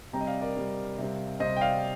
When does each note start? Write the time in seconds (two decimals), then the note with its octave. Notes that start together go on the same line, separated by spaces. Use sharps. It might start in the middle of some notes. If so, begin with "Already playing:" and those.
0.13 C3 G3 C4 G5 A#5
0.21 D#5
0.27 D5 F5
0.41 A#4 D5
0.56 C3 G3 C4
0.98 C3 G3 C4
1.40 C3 G3 C4 C5 D#5
1.56 G5
1.61 D5 F5